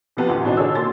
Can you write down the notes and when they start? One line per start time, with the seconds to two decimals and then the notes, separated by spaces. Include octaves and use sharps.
0.17 C3 F3 B3 F4 G4
0.28 A1 D2
0.45 B2 E3 C4 D4 D#4
0.57 D3 D#3 D4 G#4 C#5 E6
0.75 B2 A#3 C6 A6